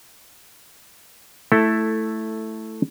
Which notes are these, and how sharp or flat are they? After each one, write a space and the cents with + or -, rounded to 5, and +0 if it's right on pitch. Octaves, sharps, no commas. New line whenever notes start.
A3 +0 E4 +0 A4 +10